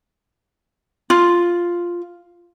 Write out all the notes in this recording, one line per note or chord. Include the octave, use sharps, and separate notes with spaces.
F4